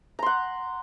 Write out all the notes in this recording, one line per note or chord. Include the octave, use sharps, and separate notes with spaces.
F#5 A#5 C6